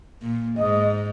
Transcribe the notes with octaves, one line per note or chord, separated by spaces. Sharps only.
A#2
G#2 D#5